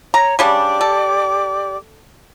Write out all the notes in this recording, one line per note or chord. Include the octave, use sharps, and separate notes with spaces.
C#5 A#5
C#3 G3 D4 G4 D5 D6
A4